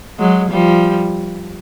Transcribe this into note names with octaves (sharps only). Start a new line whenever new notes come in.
F#3 G#3
F3 G3